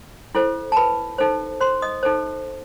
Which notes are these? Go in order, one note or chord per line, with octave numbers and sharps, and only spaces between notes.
E4 A4 C5
A5
B4 B5
D#4 A4 C5
C5 C6
D#5 D#6
D#4 A4 C5